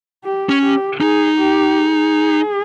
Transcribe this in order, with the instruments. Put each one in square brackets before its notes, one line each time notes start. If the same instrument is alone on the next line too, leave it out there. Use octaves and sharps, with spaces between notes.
[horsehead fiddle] G4
[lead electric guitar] C#4
[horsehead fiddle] G4
[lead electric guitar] D#4 [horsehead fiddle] G#4
[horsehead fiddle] G4
G#4